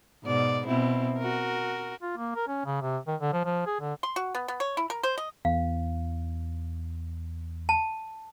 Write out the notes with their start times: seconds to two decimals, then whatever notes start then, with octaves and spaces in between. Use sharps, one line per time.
0.24 G#2 B2 D5
0.67 B2 C4 E4
1.18 F#4 A#4
2.02 F4
2.17 A#3
2.35 A#4
2.48 C#4
2.65 C#3
2.82 C3
3.07 D#3
3.21 D3
3.33 F3
3.45 F3
3.66 G#4
3.81 D3
4.03 C6
4.16 F#4
4.35 B3
4.48 B3
4.60 C#5
4.77 E4
4.90 A#4
5.03 C5
5.18 D#5
5.45 E2 F5
7.69 A5